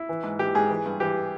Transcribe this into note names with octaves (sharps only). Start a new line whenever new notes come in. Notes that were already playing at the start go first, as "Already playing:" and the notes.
Already playing: E4
E3
G#2
E3 G4
G#2 G#4
E3
G2
E3 G4